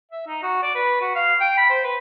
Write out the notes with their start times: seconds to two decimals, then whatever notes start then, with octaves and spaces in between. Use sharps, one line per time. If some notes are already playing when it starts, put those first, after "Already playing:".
0.12 E5
0.27 D#4
0.43 F#4
0.63 D5
0.75 B4
1.01 F#4
1.15 F5
1.41 G5
1.57 B5
1.70 C5
1.84 B4